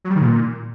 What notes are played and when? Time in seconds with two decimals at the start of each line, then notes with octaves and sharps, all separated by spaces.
0.05 F#3
0.10 G3
0.16 D#3
0.21 A#2